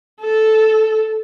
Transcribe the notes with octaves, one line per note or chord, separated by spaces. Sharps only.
A4